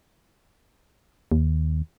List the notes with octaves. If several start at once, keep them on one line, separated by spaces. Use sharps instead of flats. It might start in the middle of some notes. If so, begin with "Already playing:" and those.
D#2